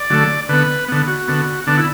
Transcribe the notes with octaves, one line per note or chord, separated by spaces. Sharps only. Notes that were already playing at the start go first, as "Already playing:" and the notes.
Already playing: D5
D3 F#3 A3
D3 B3 B4
D3 B3
F#4
D3 B3
D3 B3 D4
E4